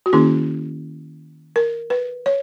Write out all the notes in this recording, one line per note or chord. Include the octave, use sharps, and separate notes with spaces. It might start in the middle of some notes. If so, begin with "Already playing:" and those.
F#4
D#3 A#3 C#4 E4 G#4
A#4
B4
C#5